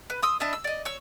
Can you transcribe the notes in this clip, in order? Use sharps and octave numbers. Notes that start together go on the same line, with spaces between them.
B4
C6 D#6 E6
D4 E4 D#5
E6
D5 D#5
C#5 E6